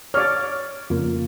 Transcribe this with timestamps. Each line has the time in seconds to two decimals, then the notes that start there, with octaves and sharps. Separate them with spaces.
0.14 C#5 D5 F6
0.90 F2 C#3 A#3 F4